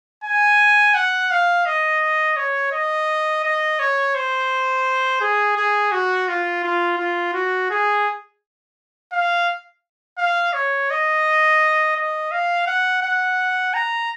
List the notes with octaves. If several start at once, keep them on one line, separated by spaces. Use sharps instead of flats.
G#5
F#5
F5
D#5
C#5
D#5
D#5
C#5
C5
G#4
G#4
F#4
F4
F4
F4
F#4
G#4
F5
F5
C#5
D#5
D#5
F5
F#5
F#5
A#5